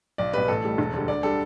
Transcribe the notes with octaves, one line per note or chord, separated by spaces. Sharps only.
B1 D5
B2 G3 B4
A1 A4
A2 G3
E1
D2 D3 G3
D2 D5
D3 G3 A4